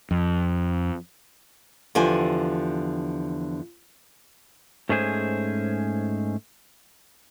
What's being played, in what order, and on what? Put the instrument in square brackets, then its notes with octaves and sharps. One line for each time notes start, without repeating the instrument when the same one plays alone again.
[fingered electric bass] F2
[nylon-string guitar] E2 D3 F3 G4 G#5
[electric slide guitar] G#2 A3 C#4 G#4 C5